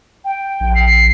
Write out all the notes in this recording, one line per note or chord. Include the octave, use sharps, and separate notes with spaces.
G5
A#1
C7